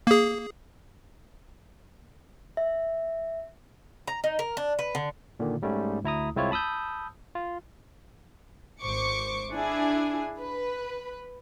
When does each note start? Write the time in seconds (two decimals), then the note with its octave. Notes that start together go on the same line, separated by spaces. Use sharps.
0.07 A#3 G#4
2.57 E5
4.07 A#5
4.24 D#4
4.39 A#4
4.57 D4
4.79 B4
4.95 D3
5.40 A#2 D3 D#3
5.62 G#2 G3 A3 C#4
6.04 D2 E4 A#5 D#6
6.36 C2 G#3 C4 E4 F4 C#5
6.51 A5 B5 D#6 E6 G6
7.35 F4
8.81 G#1 C5 C#6 D6 C#7
9.51 D4 E4 G#4 G#5
10.40 B4